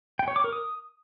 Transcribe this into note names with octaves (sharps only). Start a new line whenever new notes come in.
G5
C#5
D6
A#4
D#6